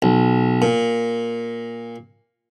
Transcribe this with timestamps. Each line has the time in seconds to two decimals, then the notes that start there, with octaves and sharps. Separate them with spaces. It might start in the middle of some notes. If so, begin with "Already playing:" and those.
0.02 B1
0.62 A#2